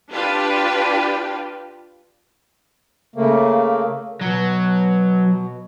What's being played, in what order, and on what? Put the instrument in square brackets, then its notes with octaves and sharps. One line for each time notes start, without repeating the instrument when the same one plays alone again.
[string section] D4 F4 G4 B4
[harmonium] C#3 A3 A#3
[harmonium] B2 [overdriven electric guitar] F#3